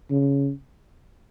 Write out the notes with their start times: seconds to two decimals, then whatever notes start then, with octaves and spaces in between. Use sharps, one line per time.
0.10 C#3